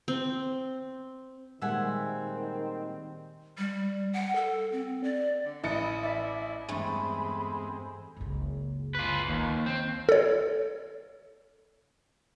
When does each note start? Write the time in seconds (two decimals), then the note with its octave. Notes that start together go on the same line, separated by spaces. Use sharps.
0.08 C4
1.61 A#2 D#3 G3 G#3 C4 E5 F#5 G#5
3.58 G3
4.13 F#5
4.36 A4
4.72 C4
5.04 D5
5.45 D3
5.64 A1 E4 D#5 A6 C#7
6.04 D5 E5
6.25 E4
6.69 E2 G2 G#3 A3 C4 G#5 B5
8.17 F#1 C#2
8.95 F4 B4
9.28 D#2
9.66 C4
10.09 A4 C#5